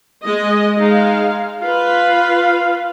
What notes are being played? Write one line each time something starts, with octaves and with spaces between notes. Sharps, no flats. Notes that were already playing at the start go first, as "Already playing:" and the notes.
G#3 D#5
G#3 D#4 F5
F4 B4 F5